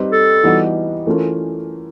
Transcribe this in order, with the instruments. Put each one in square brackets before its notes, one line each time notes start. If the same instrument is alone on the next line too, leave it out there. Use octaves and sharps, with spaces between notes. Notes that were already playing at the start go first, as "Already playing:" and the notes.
Already playing: [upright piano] G3 C4 D#4 G4 B4
[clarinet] A4
[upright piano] E3 G3 B3 D#4 F#4
E3 A3 C#4 F4 A#4